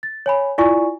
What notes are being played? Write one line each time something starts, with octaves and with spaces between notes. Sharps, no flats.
A6
C#5 G#5 B5
E4 F4 D5 G#5 C#6